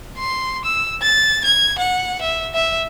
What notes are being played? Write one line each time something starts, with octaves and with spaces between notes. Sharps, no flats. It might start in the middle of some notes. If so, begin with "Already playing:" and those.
C6
E6
A6
G#6
F#5
E5
E5